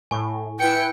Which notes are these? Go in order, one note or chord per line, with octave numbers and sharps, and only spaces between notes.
A2 G#5 C#6
E4 B4 G5 C#7